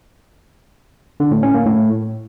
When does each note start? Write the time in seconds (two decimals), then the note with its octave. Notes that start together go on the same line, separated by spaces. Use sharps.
1.20 D3
1.31 A2
1.43 C#4
1.54 A#3
1.66 A2